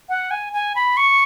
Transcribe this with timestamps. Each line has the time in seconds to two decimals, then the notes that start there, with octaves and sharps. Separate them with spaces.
0.09 F#5
0.31 G#5
0.53 G#5
0.75 B5
0.97 C#6